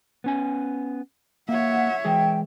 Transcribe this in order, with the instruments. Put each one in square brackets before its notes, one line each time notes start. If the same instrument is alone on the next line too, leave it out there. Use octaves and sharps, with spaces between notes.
[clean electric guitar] B3 C#4 G#5
[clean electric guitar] A#3 [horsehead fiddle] C#5 E5 [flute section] F#5
[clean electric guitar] E3 G#3 G#4 [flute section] G5